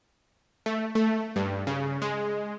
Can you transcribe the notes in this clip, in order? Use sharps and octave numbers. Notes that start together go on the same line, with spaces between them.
A3
A3
G2
C#3
G#3